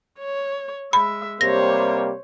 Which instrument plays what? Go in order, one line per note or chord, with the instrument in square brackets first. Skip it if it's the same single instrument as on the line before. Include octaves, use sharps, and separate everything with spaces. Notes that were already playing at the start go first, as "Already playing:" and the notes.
[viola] C#5
[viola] G#3 E5 [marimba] B5
[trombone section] C3 G3 A#3 [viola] C5 C#5 [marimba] A#6